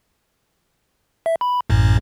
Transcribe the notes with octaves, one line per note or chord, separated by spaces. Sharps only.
E5
B5
A1 F#2 A2